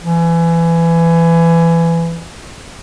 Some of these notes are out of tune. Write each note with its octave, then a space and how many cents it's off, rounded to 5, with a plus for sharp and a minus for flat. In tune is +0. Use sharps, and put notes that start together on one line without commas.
E3 +25